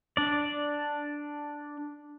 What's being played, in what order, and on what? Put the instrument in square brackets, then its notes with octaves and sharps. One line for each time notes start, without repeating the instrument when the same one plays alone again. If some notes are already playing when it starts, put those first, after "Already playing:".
[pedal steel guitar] D4 D5